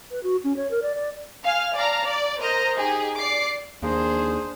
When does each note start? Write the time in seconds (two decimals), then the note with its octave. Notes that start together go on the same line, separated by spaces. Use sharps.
0.11 B4
0.23 F#4
0.44 C#4
0.57 C#5
0.71 A#4
0.82 D5
0.95 D5
1.44 F5 G#5 F6
1.75 D5 F5 A5 A#5
2.06 D5
2.43 A#4 C5 D#5 A#5
2.78 D#4 G4 G#4
3.18 D5 D6 C7
3.82 D#2 A#3 D4 G#4 C5